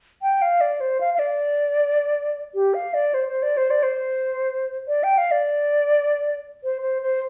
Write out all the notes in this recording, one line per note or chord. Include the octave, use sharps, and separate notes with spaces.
G5
F5
D5
C5
F5
F5
D5
G4
F5
D5
C5
C5
D5
C5
D5
C5
D5
G5
F5
D5
C5
C5
C5